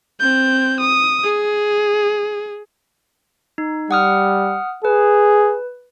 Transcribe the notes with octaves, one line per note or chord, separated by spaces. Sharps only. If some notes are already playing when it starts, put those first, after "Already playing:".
C4 G6
D#6
G#4
D#4
G3 F#5 D#6 F6
G#4 B4